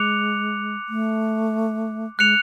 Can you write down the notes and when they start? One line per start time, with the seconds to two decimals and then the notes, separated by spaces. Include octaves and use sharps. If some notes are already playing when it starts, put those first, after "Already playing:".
Already playing: G#3 D6 F#6 C#7 F7
0.89 A3
2.19 G#3 F#6 C#7 F7